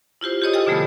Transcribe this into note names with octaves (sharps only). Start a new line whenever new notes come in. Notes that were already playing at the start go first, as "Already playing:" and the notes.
E4 F4 G4 C5
G4 G#4 C#5 D#5 D#6
A4 D#5 G5 G#5 E6 F6
B2 D3 F3 A3 B3